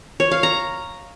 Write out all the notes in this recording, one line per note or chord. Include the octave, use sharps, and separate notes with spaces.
C#5
F5
A#5